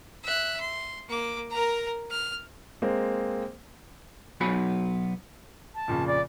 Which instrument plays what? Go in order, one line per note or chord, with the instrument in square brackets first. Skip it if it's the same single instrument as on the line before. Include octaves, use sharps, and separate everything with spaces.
[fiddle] E5 F#6
C6
A#3 D6
A#4 A#5
F6
[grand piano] G#3 A#3 C4
[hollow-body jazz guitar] B2 F#3 B3 F#4 G#5 B5
[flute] A5
[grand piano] F2 A#2 C#3
[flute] D5